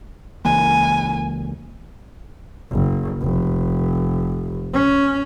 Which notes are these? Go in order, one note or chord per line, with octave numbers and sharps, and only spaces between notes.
C#2 E3 A#3 G#5
F#1
F1
C#4